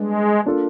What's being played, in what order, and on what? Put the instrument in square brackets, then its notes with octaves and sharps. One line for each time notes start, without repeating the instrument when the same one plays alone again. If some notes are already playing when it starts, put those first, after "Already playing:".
Already playing: [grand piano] G3 B3 D4 [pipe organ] G#3
[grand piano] A#3 D4 F4 A4